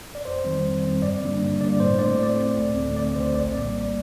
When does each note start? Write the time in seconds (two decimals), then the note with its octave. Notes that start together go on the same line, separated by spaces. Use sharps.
0.15 D5
0.25 F2 C5
0.44 D#3 G3 C4
0.65 F2
0.83 D#3 G3 C4
1.02 G2 D5
1.22 D3 G3 A#3 D4
1.41 G2
1.61 D3 G3 A#3 D4 D5
1.80 A2 C5
1.99 A3 C4 D5
2.19 A2 D5
2.38 A3 C4
2.57 D2
2.76 D3 A3 C4
2.96 D2 D5
3.16 D3 A3 C4 C5
3.35 A#1 D5
3.54 A2 G3 A#3 D5
3.73 A#1